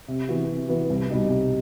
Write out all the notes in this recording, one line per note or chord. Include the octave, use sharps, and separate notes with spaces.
C3
E3 B3 F#4
C3
E3 B3 F#4
C2
B2 G3 D#4
C2